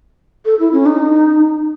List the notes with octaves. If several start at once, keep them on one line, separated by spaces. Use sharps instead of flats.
A4
E4
C#4
D#4